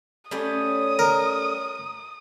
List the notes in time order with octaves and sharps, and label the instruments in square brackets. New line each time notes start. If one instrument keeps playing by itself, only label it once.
[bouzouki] G3 A3 C#4 [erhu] D#6
[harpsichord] A#4